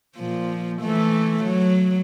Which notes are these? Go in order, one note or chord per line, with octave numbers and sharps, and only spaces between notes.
A#2 F3
E3 A3
F#3